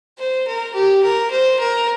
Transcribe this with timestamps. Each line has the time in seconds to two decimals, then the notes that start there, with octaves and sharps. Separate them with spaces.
0.18 C5
0.47 A#4
0.74 G4
1.03 A#4
1.31 C5
1.59 A#4